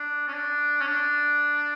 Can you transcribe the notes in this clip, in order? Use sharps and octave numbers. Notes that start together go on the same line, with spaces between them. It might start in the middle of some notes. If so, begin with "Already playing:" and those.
Already playing: D4
C#4
D4
C#4
D4